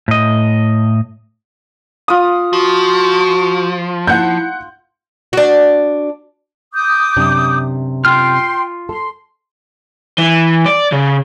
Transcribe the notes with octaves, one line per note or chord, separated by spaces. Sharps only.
A2 D#5
F4 D#6
F3 F#4
E4 F#5 G6
D4 F#4
D6 D#6 G6
F#2 C3 D4
F4 G5 C6 F6
A4 C6
E3
D5
C#3